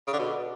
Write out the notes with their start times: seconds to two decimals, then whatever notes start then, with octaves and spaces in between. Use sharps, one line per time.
0.07 C#3
0.13 D3
0.19 B2